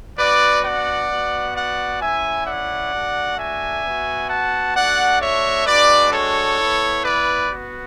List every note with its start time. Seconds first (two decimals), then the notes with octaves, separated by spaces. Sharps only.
0.18 B3 D4 F#4 B4 D5
0.64 D5 F#5
1.11 B3 F#4
1.55 D5 F#5
2.01 A3 C#4 E4 E5 G#5
2.47 D5 F#5
2.93 A3 D4 F#4
3.38 E5 G#5
3.84 B3 F#4
4.30 F#5 A5
4.75 A3 D4 F#4 D5 F#5
5.20 C#5 E5
5.66 G#3 D4 F#4 B4 D5
6.13 A4 C#5
6.58 B3 E4
7.04 B4 D5
7.50 B3 F#4